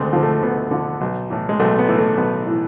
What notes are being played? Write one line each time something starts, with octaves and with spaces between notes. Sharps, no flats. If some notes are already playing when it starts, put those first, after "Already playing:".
Already playing: D2 D3 G#3 A3 C4
D3 F3
A3
D2 B3
D3 F3
B1
A2 E3
G#3
B1 A3
B3
A2 E3
A3
B1 B3
A2 E3